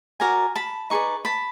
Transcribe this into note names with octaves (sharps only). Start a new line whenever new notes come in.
F#4 A#4 D5 G#5 A#5
A5 B5
D#4 G#4 B4 D5 C#6
A5 B5